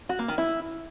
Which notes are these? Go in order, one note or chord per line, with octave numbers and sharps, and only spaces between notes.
F#4
A#3
D#3
E4